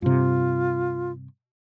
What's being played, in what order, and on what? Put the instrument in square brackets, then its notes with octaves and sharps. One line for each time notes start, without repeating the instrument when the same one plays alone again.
[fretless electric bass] G2 C3 [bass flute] F4